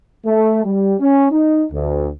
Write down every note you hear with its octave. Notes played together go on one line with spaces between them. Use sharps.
A3
G3
C#4
D#4
D2